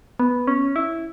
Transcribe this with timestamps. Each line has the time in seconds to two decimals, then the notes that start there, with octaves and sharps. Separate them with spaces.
0.19 B3
0.47 C#4
0.76 E4